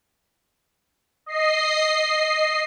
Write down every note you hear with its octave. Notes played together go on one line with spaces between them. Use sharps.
D#5 C7